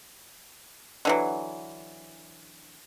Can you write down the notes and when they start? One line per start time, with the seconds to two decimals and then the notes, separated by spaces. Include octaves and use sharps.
1.05 D3 E3 F#3